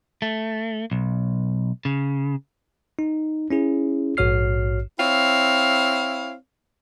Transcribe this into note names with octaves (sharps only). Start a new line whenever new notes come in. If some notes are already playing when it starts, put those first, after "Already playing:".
A3
B1
C#3
D#4
C#4 E4 G#4
A#1 G#2 F#4 C#5 F6 C7
C4 E4 C#5 F5